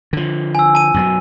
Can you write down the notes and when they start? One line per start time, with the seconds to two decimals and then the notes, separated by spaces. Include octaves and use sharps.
0.13 D3 F3
0.55 G#5 E6
0.75 A5 D#7
0.94 F#2 B2 F#3